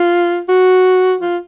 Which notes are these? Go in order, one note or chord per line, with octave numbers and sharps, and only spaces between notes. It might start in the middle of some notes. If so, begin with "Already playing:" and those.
Already playing: F4
F#4
F4